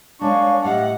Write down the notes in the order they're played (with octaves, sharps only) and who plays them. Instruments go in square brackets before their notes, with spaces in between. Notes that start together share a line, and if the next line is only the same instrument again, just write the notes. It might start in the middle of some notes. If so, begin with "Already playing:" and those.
[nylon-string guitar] G#3 A#3 [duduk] D4 [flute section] C#5 F5 G#5 [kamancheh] C#6
[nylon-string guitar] A2 F5 [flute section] G4 D#5 [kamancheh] F#5